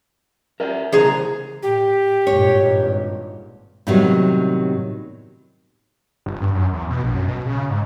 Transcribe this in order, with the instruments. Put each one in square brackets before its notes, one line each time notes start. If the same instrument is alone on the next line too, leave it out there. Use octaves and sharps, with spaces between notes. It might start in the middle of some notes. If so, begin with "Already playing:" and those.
[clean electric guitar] A#4 D5 E5
[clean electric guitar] C#3 E3 C5 [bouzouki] G#4 A#5
[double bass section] A2 [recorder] G4
[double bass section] G#1 G2 A#2 [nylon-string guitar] C#5
[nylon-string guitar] A2 C3 D#3 F#3 G3 B3
[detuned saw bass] G1
G2
F#2
E2
B2
A#1
F#2
B2
C#3
G#2